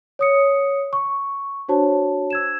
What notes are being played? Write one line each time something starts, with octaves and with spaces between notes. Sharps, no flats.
C#5 D#6 C#7
C#6
D4 F#4 C5 C#5 A5
E6 G#6 E7